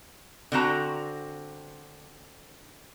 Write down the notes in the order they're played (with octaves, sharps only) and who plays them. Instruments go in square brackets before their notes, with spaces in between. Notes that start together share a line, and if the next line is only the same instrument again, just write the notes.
[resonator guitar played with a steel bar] D3 C4 F#4 A#5